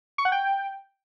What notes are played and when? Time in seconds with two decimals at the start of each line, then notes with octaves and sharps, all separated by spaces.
0.18 C#6
0.25 F#5
0.32 G5